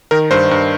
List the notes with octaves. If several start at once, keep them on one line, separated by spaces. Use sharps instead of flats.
D#3 A#4
G2 C5
G2